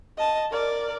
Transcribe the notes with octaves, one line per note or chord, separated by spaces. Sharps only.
D#5 A5
A#4 D5